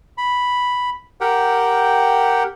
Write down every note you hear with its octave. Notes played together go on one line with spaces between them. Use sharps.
B5
G4 A#4 F#5 G5